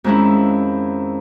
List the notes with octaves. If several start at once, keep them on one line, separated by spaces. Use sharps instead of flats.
F2 D#3 G#3 C#4 E4